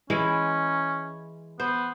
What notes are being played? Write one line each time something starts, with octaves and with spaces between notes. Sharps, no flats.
E3 G#3 C#4 E4
B3 C5